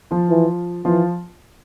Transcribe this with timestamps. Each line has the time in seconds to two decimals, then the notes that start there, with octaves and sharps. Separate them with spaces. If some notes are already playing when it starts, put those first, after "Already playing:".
0.11 F3 F4
0.30 E3
0.85 E3 F3 F4